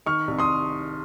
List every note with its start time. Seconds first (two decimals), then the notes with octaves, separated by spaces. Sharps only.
0.06 D#3 C#6 F6
0.28 C2
0.39 C6 D#6